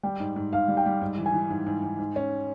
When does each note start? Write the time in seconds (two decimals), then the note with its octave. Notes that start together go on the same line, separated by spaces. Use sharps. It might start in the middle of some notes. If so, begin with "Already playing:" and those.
0.03 G3 G5
0.20 G#2
0.36 G#2
0.53 G#2 F5
0.68 G3
0.77 G5
0.86 G3
1.02 G#2
1.18 E3
1.26 G#5
1.34 E3
1.50 G#2
1.67 G#2
1.83 G#2
1.98 G#2
2.16 C#4